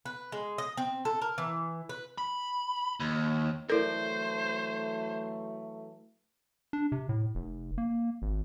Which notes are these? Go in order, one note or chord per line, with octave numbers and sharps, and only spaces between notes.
B4
G#3
D#5
C4
A4
A#4
E3
B4
B5
D#2
E3 F#3 A3 E4 A4 A#4 C5 D5
D4
C3
A2
F1
A#3
G#1